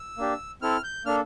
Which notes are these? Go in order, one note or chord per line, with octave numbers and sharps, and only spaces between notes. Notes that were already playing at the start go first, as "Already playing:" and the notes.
Already playing: E6
A#3 D4 G4
C4 E4 A4 F6
G6
A#3 D4 A4 F6